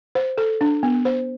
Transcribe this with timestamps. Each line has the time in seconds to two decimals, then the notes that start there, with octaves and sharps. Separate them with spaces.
0.15 C5
0.38 A4
0.61 D4
0.83 B3
1.05 C5